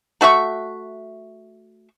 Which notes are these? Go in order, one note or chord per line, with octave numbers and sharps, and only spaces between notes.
A3 F#4 E5 C#6